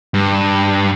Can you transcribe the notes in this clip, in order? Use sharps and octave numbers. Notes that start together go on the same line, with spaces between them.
G2